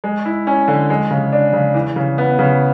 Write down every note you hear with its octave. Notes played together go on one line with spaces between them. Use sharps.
G#3
E4
C#4
D3
G#3
C#3
D4
C#3
E3
C#3
B3
C#3